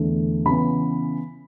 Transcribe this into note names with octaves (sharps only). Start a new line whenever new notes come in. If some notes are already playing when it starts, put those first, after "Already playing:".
Already playing: E2 D3 A3
C#3 E3 B3 B5